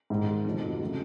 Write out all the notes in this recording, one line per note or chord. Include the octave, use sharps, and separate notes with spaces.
G#2 D#3 G#3
F2 C3 D#3 F#3 A3
C#3 F3 A3